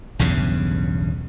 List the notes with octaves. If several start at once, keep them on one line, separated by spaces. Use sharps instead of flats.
B1 E2 G2 C#3